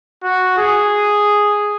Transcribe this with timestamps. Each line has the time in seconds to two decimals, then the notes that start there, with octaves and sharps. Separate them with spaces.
0.23 F#4
0.58 G#4